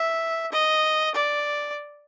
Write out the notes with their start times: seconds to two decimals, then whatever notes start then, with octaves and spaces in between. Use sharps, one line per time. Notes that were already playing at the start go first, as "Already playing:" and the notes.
Already playing: E5
0.52 D#5
1.15 D5